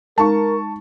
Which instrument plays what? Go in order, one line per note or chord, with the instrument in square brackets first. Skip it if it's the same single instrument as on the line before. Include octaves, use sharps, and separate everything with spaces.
[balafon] G#3 D#4 [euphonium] A#4 [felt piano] A5 C#6